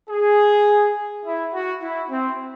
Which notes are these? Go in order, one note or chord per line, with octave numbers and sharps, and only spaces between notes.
G#4
E4
F#4
E4
C4